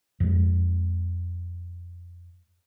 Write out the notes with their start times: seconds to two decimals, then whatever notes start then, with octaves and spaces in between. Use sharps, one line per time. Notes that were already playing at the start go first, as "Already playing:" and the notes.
0.20 F2 G#3